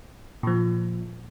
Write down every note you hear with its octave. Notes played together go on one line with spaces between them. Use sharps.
A#2 F3